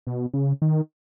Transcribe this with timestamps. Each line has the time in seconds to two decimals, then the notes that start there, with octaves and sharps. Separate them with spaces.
0.07 B2
0.34 C#3
0.62 D#3